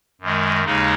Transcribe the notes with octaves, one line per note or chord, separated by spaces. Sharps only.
F#2 D#3 G#3
D#2 C#3 G#3 D#4